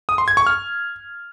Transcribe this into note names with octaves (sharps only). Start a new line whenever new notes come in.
D#6
C6
G#6
C#6
F6